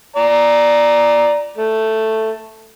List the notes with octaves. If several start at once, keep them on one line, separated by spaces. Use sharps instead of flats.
D5 A#5
A3